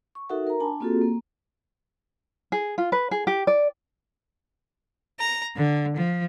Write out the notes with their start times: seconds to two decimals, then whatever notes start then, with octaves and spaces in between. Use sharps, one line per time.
0.15 C#6
0.30 D#4 F#4 A4 A#4 E5 F#5
0.47 A#4 A#5
0.60 D4 G#5 A5 B5
0.80 A#3 C4 F4 F#4 G#4 A4
1.02 A#3
2.52 G#4
2.78 F4
2.92 B4
3.11 G#4
3.27 G4
3.47 D5
5.20 A#5
5.55 D3
5.96 F3